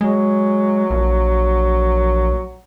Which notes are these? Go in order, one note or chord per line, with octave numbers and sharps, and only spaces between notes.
F#3 G#3
A#1